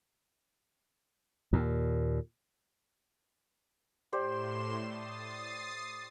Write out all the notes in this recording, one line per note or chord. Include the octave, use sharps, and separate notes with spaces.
D#2 A#2
A2 G4 C5 D5 C6 E7
D#6 A6 C7